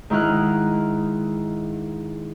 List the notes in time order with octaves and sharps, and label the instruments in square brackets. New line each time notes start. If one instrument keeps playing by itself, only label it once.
[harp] G#2 D#3 E4 F6 F#6